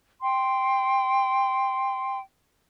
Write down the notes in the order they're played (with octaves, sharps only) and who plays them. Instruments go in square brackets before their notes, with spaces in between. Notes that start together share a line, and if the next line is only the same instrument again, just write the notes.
[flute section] G5 C6